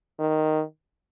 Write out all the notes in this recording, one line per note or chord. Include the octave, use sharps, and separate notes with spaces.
D#3